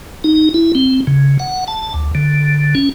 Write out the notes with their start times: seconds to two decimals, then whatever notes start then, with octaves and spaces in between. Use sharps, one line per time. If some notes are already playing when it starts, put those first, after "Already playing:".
0.24 D#4
0.54 E4
0.75 C4
1.07 C#3
1.40 F#5
1.68 A5
1.94 D2
2.15 D3
2.75 C#4